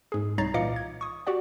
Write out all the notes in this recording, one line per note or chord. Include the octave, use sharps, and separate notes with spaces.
G#2 G#4
C2 D#4 C#5 A#5 A6 C7
A#2 E3 D#5 F5 D6 C#7
G#6
C#6 D#6
F#4 G4 D5 F#5